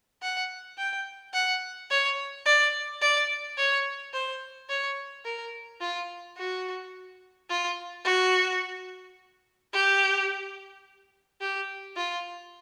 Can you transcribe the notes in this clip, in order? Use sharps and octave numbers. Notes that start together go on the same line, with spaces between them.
F#5
G5
F#5
C#5
D5
D5
C#5
C5
C#5
A#4
F4
F#4
F4
F#4
G4
G4
F4